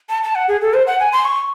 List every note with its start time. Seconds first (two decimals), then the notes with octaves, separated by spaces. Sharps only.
0.09 A5
0.23 A5
0.35 F#5
0.48 G#4
0.62 A4
0.74 C5
0.87 F#5
1.00 G#5
1.13 C6
1.25 C#6